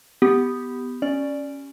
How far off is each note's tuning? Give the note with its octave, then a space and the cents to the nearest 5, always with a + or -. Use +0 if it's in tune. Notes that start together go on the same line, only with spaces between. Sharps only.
B3 +5 G4 +0
C#4 +0 D5 +0